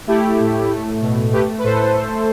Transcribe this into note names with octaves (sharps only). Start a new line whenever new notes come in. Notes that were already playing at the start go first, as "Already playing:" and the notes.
A3 E4 G4
A2
A3
B2
A3 G4 B4
B4
A2 A4 C5
A3